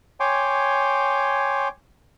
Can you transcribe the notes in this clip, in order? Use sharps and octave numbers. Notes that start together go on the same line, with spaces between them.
C#5 G5 G#5 C6 D6